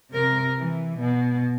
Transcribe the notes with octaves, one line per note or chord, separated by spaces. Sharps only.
C3 A#4
E3
B2